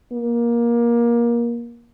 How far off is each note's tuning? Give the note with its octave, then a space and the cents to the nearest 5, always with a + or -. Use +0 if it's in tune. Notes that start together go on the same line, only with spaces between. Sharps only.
A#3 +20